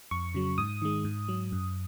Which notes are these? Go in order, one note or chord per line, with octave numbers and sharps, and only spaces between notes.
F2 C#6
C#3 F#3
G#2 D#6
D#3 G#3
G#2
F#3
F#2